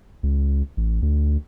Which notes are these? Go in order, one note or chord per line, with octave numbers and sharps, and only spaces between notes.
C#2
A1
D2